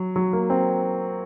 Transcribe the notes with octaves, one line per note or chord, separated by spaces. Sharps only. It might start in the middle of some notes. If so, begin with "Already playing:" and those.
Already playing: F#3
F#3
A#3
C4